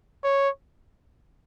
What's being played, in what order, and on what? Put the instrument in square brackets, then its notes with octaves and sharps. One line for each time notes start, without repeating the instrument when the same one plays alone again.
[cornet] C#5